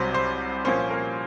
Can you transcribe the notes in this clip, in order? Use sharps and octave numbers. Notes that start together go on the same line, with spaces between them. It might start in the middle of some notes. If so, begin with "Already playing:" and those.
Already playing: C2 C3 F#3 C5
C5
A#2 F3 A#3 C#4 C5
A#4